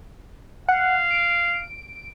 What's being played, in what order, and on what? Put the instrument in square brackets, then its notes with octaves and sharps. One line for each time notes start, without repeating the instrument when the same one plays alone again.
[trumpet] F5 [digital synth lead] F#5
[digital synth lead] D7